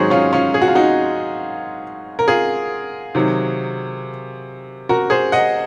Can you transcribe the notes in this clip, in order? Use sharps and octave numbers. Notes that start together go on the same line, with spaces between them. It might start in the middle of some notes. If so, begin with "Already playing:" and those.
Already playing: G#2 D#3 F#3 D#4 F#4 G#4 C5 C#5
C#4 F4
C#4 F4
G#4
F#4
F4
D#4 F#4
A#4
F4 G#4
C3 D#3 F#3
F#4 A#4
G#4 C5
D#5 F#5